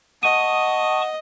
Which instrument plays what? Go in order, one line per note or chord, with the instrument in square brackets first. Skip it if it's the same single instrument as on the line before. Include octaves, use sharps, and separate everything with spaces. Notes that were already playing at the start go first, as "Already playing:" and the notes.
[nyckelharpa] D#5 [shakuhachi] F#5 [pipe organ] A5 C#6 D#6 [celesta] D#7